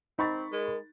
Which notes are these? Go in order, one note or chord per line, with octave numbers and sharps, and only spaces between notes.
C4 D#4 B5 C#6 A6
G#3 A#4